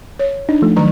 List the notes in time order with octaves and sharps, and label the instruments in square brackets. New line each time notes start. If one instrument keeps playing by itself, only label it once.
[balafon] C#5
[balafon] D4 [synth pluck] D#4
[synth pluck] F3 A3
[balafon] D#3 F#3 A#5